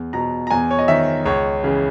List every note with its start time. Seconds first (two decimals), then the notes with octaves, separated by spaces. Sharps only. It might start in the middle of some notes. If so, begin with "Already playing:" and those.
Already playing: E2
0.13 B2 A#5
0.47 A#5
0.51 E2 G#5
0.71 C#5
0.79 D#5
0.88 D#3 E5
1.25 C#2 C#5
1.63 C#3 E3